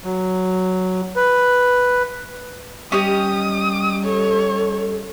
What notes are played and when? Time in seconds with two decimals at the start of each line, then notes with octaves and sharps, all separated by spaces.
0.04 F#3
1.16 B4
2.92 G3 C#4 G4 D#5 D#6
4.04 A4 C#5